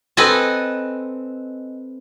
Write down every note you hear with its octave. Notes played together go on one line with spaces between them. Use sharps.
C4 A4 B4 D#5 G#5 A5